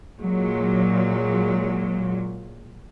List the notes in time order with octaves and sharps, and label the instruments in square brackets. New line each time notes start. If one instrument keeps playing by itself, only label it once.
[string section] A#2 F#3 G#3